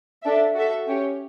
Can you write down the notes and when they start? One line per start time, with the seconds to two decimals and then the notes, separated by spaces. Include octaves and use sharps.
0.23 D4 A4 E5
0.54 F#4 A4 E5
0.87 C#4 G4 C#5